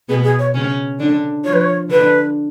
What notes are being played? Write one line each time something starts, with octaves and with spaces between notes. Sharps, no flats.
B2 B3 G#4
G#4
C#5
C#3 C#4
D3 D4
F3 F4 C#5
B4
C#5
D3 D4 B4